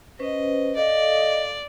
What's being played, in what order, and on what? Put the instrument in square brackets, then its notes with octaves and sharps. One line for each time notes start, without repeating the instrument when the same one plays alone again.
[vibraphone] C#4 B4 C5 [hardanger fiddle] D#5
[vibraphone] A4 F5 [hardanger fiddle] D5 [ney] D#5